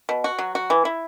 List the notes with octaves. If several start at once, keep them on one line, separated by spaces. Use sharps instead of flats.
B2
F#4
F#3
F#4
E3
E4